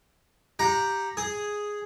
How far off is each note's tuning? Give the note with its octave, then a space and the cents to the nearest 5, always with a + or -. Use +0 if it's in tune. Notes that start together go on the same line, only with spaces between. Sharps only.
G4 +0 F#5 -25 A#5 +0
G#4 +0 D#6 +0